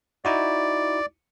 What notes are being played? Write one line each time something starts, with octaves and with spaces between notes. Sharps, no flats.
D#4 E4 F#4 D5